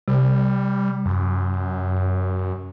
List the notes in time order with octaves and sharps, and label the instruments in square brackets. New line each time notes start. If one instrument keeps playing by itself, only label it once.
[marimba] C3 [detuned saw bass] G3
[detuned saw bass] F#2